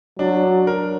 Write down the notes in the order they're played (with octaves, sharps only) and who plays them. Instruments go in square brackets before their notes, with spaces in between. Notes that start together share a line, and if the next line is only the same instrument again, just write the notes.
[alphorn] F#3 [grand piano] D4
[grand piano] D4
A#4